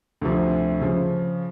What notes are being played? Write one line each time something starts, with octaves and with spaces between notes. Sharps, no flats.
D2 C3 F3
C#3 F3